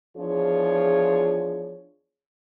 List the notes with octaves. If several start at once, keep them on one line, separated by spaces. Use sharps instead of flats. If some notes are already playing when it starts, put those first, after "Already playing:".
E2 F3 D4 F4 G#4 C#5